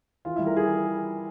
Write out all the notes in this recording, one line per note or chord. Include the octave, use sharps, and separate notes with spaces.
E3 F4
G3 E4
A#4
E3 G#4